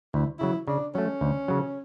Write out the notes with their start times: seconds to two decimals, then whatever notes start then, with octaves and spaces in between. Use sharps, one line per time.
0.14 D2 E4
0.39 C#3 F#3 E4
0.68 C#3 D4
0.95 F#3 A3 C#4
1.21 D2
1.48 C#3 F#3